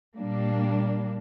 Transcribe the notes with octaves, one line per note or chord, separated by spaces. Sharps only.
A#2 G3 A#3 D4